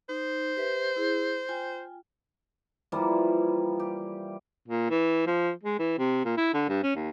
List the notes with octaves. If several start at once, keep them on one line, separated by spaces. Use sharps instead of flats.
D#4 C5
G4 B4 E5
E4 G#4
F4 G5 G#5
E3 F3 G3 A#3
G4
A#2
E3
F3
G#3
E3
C3
A#2
E4
D3
G2
C#4
D#2